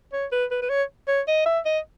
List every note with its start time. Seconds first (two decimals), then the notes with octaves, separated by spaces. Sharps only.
0.13 C#5
0.32 B4
0.51 B4
0.62 B4
0.70 C#5
1.08 C#5
1.28 D#5
1.46 E5
1.66 D#5